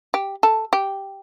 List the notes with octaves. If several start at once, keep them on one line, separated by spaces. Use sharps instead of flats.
G4
A4
G4